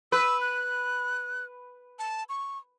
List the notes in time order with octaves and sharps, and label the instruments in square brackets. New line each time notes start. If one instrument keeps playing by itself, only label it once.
[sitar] B4 [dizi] E6
[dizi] F#6
A5
C#6